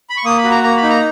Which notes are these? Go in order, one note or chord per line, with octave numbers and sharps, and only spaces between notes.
B5
C#6
A#3 D#6
B5
F#4
A#5
A#3 A#5
B5
D#4
A#5